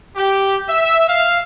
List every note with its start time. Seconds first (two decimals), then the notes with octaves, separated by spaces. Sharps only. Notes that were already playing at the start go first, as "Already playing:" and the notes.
0.16 G4
0.69 E5
1.08 F5